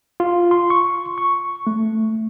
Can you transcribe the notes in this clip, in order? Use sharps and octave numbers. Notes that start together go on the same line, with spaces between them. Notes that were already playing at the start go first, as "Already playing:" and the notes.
F4
C6
C#6
C#6
A3